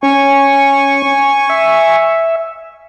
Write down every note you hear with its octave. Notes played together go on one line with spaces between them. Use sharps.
C#4 G#5 C#6
E5